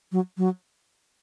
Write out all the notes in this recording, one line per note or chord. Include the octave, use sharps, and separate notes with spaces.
F#3
F#3